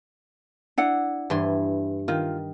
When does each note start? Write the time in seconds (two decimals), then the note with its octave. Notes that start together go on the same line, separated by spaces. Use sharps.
0.78 D4 E4 F#5
1.30 G2 E3 C6
2.08 D#3 F4